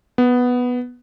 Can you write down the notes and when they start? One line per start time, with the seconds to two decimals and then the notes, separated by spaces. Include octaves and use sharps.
0.18 B3